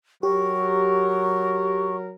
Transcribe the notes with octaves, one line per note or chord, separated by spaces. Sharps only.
F#3 G4 A#4 C#6